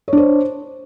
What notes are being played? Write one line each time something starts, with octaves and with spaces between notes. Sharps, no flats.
D4 C5 C#5